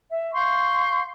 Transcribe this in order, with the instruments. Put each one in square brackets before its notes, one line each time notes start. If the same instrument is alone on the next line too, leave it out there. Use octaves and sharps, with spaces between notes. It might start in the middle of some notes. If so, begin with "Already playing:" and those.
[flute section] E5
F5 C6 C#6 G6